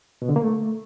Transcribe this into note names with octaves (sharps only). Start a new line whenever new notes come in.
B2
D3
A#3
A3